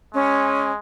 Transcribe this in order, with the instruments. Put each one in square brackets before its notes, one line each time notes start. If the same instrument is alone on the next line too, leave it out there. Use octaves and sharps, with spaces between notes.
[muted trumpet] G#3 [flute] C#4